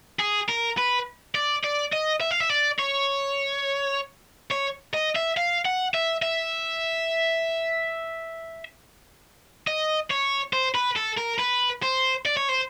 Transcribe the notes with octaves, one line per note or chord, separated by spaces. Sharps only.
G#4
A#4
B4
D5
D5
D#5
E5
F5
E5
D5
C#5
C#5
D#5
E5
F5
F#5
E5
E5
D#5
C#5
C5
B4
A4
A#4
B4
C5
D5
C#5
C5